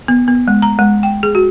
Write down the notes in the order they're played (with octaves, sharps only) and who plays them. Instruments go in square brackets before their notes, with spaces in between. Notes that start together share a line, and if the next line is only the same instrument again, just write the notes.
[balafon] B3
B3
G#3
A#5
G#3
G5
G#4
F#4